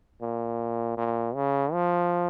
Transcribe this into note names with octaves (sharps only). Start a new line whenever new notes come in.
A#2
A#2
C#3
F3